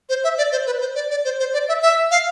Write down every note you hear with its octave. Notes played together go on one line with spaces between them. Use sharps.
C5
E5
D5
C5
B4
C5
D5
D5
C5
C5
D5
E5
E5
F5